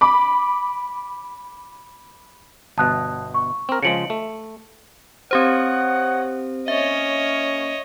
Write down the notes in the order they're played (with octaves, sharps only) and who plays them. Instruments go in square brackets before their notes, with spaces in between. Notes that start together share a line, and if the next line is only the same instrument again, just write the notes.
[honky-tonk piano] B5 D6
[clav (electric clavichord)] G1 B2 [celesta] A5 D#6 F#6
[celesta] C#6
[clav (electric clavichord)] C4 A#4
[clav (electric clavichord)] C#3 F3 G#3 [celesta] C#7 D7 F#7
[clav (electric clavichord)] A3
[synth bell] C4 G4 C5 [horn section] C#5 D#5 F#5
[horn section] A#3 C#4 [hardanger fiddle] C#5 D#5 [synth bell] E5